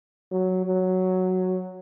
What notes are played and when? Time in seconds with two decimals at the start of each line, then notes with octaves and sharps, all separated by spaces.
0.31 F#3
0.66 F#3